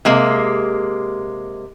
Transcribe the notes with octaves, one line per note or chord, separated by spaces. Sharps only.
C3 G#3 A#3